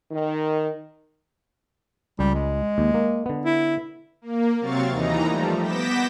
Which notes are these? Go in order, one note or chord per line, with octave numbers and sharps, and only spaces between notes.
D#3
C#2 G3
G#3
D#2
A#3
D3 B3
E4
A#3
C3 F#3 C4 F5 C#6 A6
D#2 E3 D#4 A#5
F3 G3 A3
B3 D6 G6 A#6 B6 E7